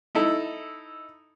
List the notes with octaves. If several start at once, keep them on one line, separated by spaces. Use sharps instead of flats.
D#4 E4 A4